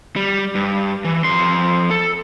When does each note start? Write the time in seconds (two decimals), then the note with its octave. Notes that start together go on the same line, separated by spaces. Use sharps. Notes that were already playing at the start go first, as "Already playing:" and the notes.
0.16 G3
0.55 G2
1.04 E3
1.24 F2 C6
1.91 A4